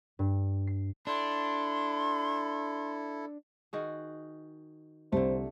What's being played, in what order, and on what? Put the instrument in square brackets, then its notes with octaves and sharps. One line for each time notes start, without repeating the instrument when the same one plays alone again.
[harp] G2
C7
[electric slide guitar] D4 [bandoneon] E4 A4 [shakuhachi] C6
[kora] D#3 F#4 G#4
[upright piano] C2 [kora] D3 A3 [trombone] C5